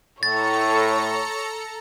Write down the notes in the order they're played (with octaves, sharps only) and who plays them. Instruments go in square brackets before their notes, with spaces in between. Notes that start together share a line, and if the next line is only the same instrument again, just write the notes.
[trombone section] A2 [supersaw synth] A4 A#5 C#7 [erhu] C#5 [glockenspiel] A6